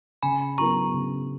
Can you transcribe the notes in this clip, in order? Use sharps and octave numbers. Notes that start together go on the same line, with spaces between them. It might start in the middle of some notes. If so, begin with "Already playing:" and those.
C#3 G#5 B5
F#3 B3 E4 A#4 A#5 C#6
C#3